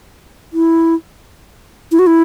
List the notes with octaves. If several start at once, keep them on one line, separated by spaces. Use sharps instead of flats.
E4
E4
F#4
E4